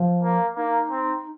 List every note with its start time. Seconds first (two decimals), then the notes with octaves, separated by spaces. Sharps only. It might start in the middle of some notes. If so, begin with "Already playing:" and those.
Already playing: F3
0.23 A#3
0.56 A#3 D#4
0.91 C4